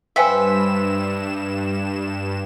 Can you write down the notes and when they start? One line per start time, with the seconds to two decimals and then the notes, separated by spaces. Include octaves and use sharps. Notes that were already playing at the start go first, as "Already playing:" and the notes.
0.16 G2 B4 C5 E5 F5 G5 G#5 E7